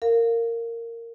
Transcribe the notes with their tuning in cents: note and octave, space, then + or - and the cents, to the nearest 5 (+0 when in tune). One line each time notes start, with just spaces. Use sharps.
A#4 -15 F5 +0